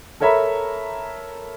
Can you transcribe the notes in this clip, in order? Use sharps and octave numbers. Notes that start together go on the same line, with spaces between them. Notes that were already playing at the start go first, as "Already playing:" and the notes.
A4 A#4 C#5 E5 A#5 B5